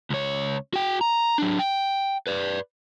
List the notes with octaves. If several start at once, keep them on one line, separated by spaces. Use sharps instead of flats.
C#2 C#5
F#4 G5
A#5
F#3 D4
G5
B4 D5